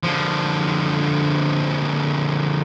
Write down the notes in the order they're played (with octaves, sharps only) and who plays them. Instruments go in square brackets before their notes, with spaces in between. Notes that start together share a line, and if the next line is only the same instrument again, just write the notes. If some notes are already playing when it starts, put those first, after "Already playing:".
[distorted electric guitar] D3 F3